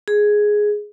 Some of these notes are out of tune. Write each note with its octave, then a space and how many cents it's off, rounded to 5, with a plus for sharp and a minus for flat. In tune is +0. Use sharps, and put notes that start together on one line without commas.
G#4 +5